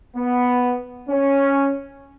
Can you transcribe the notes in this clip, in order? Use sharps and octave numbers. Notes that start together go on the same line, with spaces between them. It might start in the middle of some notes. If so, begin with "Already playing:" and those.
B3
C#4